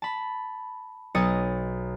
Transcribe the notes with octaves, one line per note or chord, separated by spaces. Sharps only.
A5 B5
B1 C#5 D#5 D#6 A6 C#7